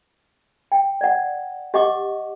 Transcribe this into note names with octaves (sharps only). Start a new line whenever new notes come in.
G5
D5 F#5
G4 D#5 F#5 C#6 D6